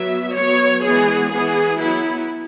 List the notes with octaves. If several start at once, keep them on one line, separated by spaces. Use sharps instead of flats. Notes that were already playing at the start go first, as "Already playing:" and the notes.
Already playing: F#3 B3 E5
F#3 B3 C#5
E3 G#3 B3 G#4
E3 B3 G#4
F#3 B3 E4